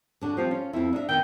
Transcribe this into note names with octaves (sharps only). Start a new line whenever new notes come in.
D3 D4 F#4
F3 G3 C4 F4
C#4 F4
F2 B3 C4 E4
D4 D#4 E5
D#3 B3 D#4 G5